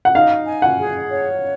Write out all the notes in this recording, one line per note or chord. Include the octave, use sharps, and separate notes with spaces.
F#5
D#4 F5
G#5
F#5
G#4
C#5